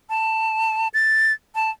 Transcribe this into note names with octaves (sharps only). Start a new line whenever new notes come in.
A5
A6
A5